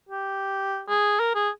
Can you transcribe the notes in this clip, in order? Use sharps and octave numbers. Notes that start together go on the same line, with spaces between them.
G4
G#4
A#4
G#4